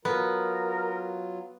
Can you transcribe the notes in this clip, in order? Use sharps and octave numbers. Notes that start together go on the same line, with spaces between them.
F#3 B3 F4 A#4